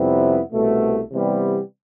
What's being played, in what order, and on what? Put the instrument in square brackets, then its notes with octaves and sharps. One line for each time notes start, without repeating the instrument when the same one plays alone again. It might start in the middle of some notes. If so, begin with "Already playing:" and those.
Already playing: [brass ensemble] F2 C3 G3 B3 E4
C2 B2 A3
C3 E3 G3 B3